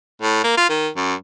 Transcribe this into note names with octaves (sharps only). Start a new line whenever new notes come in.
A2
A#3
F4
D#3
F#2